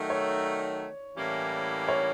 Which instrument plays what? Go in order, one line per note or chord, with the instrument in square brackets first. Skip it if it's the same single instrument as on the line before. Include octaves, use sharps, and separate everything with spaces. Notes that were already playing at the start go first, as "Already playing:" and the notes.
Already playing: [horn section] D#3 F#3 A3 [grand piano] D5
[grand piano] C#5
[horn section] A2 E3 G3 A#3 C#4
[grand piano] C#5